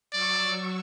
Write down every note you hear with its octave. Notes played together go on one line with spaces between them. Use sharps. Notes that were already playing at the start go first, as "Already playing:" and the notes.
F#3 D5 C#6 E6